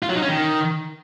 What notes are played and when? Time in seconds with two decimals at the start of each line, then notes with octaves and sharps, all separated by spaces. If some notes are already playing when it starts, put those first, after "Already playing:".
0.03 F4
0.09 F#3
0.16 D#4
0.22 C#4
0.29 D#3